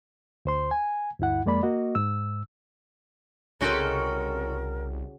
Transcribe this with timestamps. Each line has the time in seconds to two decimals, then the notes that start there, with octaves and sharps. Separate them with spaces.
0.45 D2 C5 C6
0.71 G#5
1.19 D2 G2 E4 F#5
1.46 F2 G#3 A#3 D5 B5
1.63 A#3 F#4 D#5
1.95 G#2 E6
3.61 C2 C#3 G#3 C#4 F#4 A4 A#4 G5